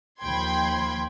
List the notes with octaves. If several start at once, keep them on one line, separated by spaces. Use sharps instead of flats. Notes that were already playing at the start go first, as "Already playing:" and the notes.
D#2 F3 G5 B5 C6 G#6